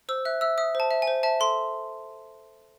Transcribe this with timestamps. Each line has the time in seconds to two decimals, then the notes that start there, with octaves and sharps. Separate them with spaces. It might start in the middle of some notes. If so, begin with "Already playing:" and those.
0.09 C5 E6
0.25 E5 F#6
0.41 E5 E6
0.58 E5 D#6
0.75 C5 A5
0.91 E5
1.02 G#5
1.07 C5
1.23 E5 A5
1.40 A4 C6